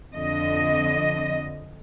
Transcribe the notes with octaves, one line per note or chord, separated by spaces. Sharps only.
F2 D3 D#5